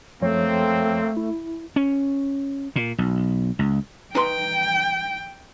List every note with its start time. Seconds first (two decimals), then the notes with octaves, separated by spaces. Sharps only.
0.21 F#2 F3 A3 A#3 C4 C#5
1.17 E4
1.76 C#4
2.76 A#2
2.98 B1
3.59 C#2
4.15 D#4 B4 G5 C6